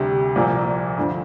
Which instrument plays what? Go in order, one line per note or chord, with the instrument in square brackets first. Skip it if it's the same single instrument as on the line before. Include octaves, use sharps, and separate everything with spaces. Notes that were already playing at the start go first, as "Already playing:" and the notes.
Already playing: [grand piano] D2 C3 G3
C2 A#2 F3 A#3
D2 D3 F3